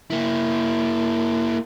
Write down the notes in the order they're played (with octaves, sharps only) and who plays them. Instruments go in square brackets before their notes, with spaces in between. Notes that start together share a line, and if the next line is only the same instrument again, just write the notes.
[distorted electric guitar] A#3 E4